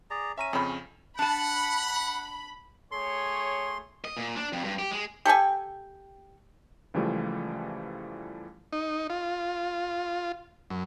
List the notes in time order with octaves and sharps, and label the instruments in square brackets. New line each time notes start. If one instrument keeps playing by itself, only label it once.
[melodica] G#4 D5 A#5
[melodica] C#4 [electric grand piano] E5 A#5 D#7
[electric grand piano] F2 C#3 [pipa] C4 B5
[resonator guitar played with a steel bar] D4 A5 [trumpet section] F#5 [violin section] B5
[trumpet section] A3 G#4 C#5 [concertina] C6
[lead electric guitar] D#5
A#2
D4
F2
G2
G4
G#3
[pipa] G4 A4 G5 G#5
[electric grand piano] C#2 E3 F3 G3 A3
[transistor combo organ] D#4
F4
F#2